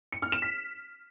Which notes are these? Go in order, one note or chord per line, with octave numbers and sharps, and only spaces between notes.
C#7
F6
E7
B6